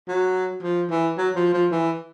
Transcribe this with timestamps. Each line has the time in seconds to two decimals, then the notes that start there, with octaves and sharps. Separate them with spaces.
0.08 F#3
0.63 F3
0.90 E3
1.18 F#3
1.36 F3
1.53 F3
1.72 E3